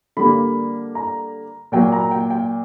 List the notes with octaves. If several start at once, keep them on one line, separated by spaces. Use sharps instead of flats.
D3 G3 A#3 B5
A#5
A#2 F#3 A#3 G5
A#5
G5
G5